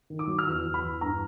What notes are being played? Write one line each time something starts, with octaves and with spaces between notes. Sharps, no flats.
D#3
D6
F#3
F6
E2 E6
E2
B5
E2
G2 A#5